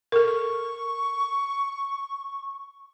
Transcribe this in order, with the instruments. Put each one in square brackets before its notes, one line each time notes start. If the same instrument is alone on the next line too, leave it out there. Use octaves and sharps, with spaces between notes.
[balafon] A4 A#4 [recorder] C#6